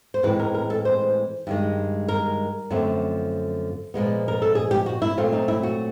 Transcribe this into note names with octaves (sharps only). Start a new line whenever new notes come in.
C5
A2 E3 G#3 C4 B4
A#4
A#4
A4
C5
G2 D#3 G#3
A#4
F#2 D3 F3 A3 C4
A#2 F3 G#3 B3
A#4
A4
G#4
G4
F#4
E4
A#2 F#3 A3 C4 F4
D#4
E4
F#4